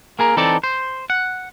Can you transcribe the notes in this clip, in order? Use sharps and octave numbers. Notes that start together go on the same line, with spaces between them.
A#3 G#4 A#4
E3 C4 D#4 A4 D5 A5
C5
F#5